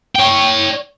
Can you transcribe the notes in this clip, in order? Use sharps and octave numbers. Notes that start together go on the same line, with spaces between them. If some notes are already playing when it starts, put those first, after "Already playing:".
C#5 G5